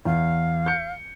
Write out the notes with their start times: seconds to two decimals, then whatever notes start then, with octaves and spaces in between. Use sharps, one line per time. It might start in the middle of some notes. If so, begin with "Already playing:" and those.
0.05 E2 F5
0.66 G6 C#7